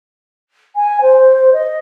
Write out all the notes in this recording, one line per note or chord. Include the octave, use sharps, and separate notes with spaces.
G#5
C5
D#5